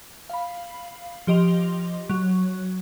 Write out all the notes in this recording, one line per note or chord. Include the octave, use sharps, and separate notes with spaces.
F5 B5
F3 G4 D#5 C6 F7
F#3